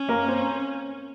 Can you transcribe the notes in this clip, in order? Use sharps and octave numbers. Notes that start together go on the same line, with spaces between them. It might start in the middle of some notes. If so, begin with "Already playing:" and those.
Already playing: C#4
A#3 A#4
C4 C5